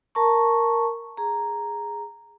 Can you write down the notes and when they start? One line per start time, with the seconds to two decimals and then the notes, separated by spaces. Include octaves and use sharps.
0.15 A#4 A5 A#5 C#6
1.17 G#4 A#5